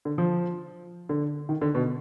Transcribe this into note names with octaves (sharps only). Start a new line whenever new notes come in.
D3
F3
D3
D#3
D3
B2